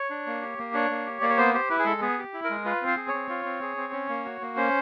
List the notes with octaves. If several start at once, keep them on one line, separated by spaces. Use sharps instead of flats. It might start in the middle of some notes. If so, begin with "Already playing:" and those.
Already playing: C#5
D4
A#3
G4
A#3
D4 C#5
A#3
G4
A#3 D5
C#5
B3 C5
G4 C5
E4 B4
G#4
G#3 A4
B3 G#4
G4
E4
A#4
G#3
F4 B4
C4
C5
G#4
C#5
C4
F4
C4
G#4
C4
C#4
A#3
F#4
A#3
C#4 C5